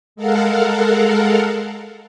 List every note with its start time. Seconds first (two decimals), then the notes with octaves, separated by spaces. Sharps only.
0.16 G#3 A4 A#4 F5 F#5